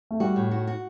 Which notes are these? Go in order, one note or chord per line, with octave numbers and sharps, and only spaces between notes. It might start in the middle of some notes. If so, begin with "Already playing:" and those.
A3
G3 F#4
A2
F#4
F#4